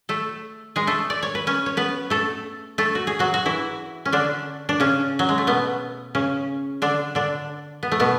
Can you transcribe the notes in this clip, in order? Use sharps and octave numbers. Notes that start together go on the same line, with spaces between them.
A3 A4
G#3 G#4
A3 A4
D5
C#5
B4
C#4 C#5
C#5
B3 B4
A3 A4
A3 A4
F#4
G#4
F#3 F#4
F#4
E3 E4
C#4
D3 D4
D4
C#3 C#4
F#3
G#3
A3
B2 B3
C#3 C#4
D3 D4
D3 D4
B3
A3
B2 B3